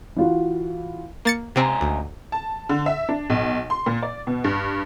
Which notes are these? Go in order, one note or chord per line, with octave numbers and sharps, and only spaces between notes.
E3 F4 F#4
A#3 A6 C#7
C#2 C3 C4 G#5 A#5
D2
A5
D3
E5
D4
B1
C6
A#2
D5
B2
G2